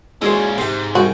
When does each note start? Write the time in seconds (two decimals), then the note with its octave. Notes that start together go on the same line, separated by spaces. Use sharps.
0.22 A#2 G#3 C#4 E4 F#4 C5
0.58 G#2 C3 G4 C5
0.95 C2 C3 F#4 G5